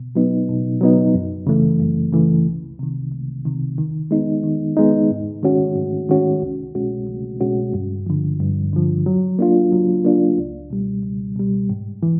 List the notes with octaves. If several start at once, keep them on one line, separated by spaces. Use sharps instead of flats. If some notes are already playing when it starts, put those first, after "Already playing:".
Already playing: B2
F#3 B3 D#4
B2
F#3 B3 D#4
F#2
C#3 E3 A3
F#2
C#3 E3 A3
C2
C3 D#3
C2
C3 D#3
D#3
G#3 B3 D#4
D#3
G#3 B3 D#4
G#2
D#3 G#3 C#4 F#4
G#2
D#3 G#3 C#4 F#4
C2
B2 G#3 C#4 F#4
C2
B2 G#3 C#4 F#4
G2
D3 F3
G2
D3 F3
F#3
A#3 D4 F4
F#3
A#3 D4 F4
C#2
B2 G3
C#2
B2 G3
G#2
E3